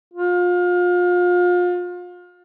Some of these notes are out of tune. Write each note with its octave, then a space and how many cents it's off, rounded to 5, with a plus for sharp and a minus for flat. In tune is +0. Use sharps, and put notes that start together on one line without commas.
F4 +30